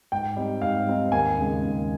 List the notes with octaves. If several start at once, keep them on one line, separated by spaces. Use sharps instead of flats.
G#2 G5
G3 C4 D#4
G#2 F5
G3 C4 D#4
D#2 G#5
C#3 G#3
D#2